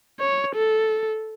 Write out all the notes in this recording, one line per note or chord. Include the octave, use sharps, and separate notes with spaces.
C#5
A4